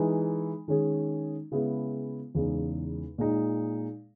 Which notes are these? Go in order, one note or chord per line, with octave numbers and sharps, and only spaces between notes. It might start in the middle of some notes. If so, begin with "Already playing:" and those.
Already playing: E3 G#3 D#4
D#3 G#3 C#4 G#4
C#3 G#3 B3 E4 G#4
E2 C#3 G#3 D#4
A#2 G#3 D#4